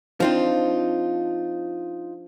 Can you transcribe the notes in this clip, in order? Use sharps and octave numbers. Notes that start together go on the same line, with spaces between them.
F3 C4 D4 D#4 F4